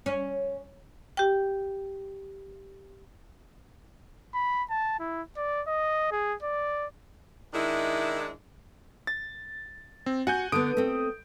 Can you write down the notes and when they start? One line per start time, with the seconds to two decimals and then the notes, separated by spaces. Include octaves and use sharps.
0.06 C#4
1.17 G4 G5
4.34 B5
4.70 A5
4.99 E4
5.37 D5
5.67 D#5
6.12 G#4
6.43 D5
7.53 D#3 G#3 D4 E4
9.07 A6
10.06 C4
10.27 F#4 F#5 G#5 G6
10.52 D3 B3 D#6 D7
10.77 A3 C4